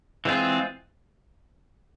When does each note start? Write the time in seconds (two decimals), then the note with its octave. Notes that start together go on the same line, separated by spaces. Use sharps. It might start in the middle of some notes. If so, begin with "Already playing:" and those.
0.25 E3 G#3 C4 F4 G#4